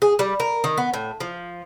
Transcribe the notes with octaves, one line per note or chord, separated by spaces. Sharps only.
G#4
G3
A#4
D#3
B3
A2
F3